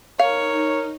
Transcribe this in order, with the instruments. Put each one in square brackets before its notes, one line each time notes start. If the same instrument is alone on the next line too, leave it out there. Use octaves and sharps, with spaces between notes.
[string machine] D#4 [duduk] A#4 [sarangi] C#5 [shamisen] F5